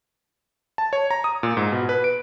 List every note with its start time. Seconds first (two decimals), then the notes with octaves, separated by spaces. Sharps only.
0.78 A5
0.93 C#5
1.11 A#5
1.24 D#6
1.43 A#2
1.57 G#2
1.72 B2
1.89 B4
2.04 D7